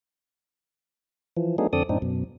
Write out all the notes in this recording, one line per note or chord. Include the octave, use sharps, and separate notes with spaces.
E3 F3
F#3 A3 B3 D4 D#4 G#4
F2 D3 C4 A4 D5 D#6
F#2 A2 C4 D4 D#4
F#2 B2